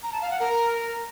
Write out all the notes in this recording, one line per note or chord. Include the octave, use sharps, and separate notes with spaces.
A#5
A5
F5
F#5
A#4